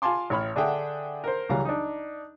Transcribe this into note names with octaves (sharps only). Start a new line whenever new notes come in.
F4 F5 G#5 A5 C6 D6
A1 C#5 B5 F6
D3 D4 G#4 E5 F#5 G5
A#4 C5
C#2 E3 F#3 G3 F5 A#5
D4 D#4